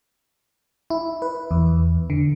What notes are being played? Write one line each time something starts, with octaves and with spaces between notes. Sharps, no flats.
E4
B4
E2
D3